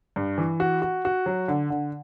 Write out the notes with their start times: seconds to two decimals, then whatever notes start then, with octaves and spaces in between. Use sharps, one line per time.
0.16 G2
0.38 E3
0.60 F#4
0.82 F#4
1.05 F#4
1.26 F#3
1.48 D3
1.70 D3